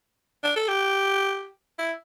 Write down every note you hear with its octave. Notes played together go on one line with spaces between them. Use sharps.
D4
A4
G4
E4